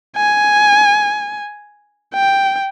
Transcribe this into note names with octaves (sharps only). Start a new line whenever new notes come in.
G#5
G5